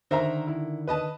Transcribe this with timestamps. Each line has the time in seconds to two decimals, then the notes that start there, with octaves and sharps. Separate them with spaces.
0.11 D3 D#3 A#4 C5 E5 A#5
0.47 E4
0.88 B4 D#5 A5